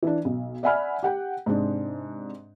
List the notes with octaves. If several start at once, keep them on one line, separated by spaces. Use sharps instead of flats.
E3 D4
B1
D5 E5 F#5 G#5 B5 F6
G4 F#5 G5
G#2 C3 G#3 D4